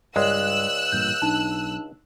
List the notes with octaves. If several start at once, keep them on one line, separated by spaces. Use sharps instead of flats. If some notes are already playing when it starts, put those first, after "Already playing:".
C#2 G2 G#3 D5 E6 F#6
A1 G2 A#2 G6
B1 D4 D#4 A5